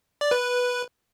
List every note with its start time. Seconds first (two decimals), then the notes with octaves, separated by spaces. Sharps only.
0.21 D5
0.31 B4